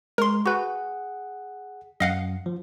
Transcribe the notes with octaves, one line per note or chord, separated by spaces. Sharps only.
G#3 A#4 C6
F#4 G#4 B4 F#5
F#2 F#3 D#5 F5 F#5
F3